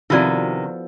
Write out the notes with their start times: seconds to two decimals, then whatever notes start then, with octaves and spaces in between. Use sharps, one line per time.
0.10 C3 D#3 F3 B3 E4 F#4 A4 D5